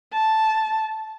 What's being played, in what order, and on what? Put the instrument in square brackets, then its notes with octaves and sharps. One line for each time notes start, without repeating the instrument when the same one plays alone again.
[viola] A5